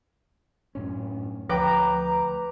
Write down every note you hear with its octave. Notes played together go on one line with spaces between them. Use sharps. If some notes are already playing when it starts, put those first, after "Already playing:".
F#2 A2 C#4
D2 F3 B4 G5 A#5 D6